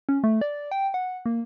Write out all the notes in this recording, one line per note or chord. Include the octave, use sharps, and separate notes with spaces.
C#4
A3
D5
G5
F#5
A#3